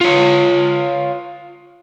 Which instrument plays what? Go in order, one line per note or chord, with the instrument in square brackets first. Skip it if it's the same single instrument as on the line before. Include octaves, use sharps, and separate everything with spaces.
[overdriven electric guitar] F4 C#5